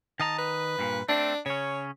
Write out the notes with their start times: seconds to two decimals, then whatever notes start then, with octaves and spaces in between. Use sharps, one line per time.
0.20 D#3 D#5 A5 A#5
0.38 B4
0.79 G2 A#2
1.09 A3 C4 D4
1.46 C#3 C#4 C#5